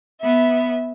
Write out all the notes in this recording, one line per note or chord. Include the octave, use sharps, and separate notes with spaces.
B3 E5